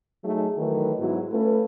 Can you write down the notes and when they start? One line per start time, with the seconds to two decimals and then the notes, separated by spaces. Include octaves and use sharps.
0.24 F#3 A3 D#4 G#4
0.58 D#3 E3 F#3 A3 A#4 B4
0.99 G#2 F#3 B3 E4 F#4
1.32 A3 C#4 F4 A4 B4